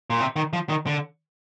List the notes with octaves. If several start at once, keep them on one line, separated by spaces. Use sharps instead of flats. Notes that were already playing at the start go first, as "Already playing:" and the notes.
A#2
C3
D#3
F3
D#3
D3